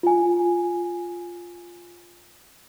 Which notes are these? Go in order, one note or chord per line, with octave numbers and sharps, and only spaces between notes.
F4 G#5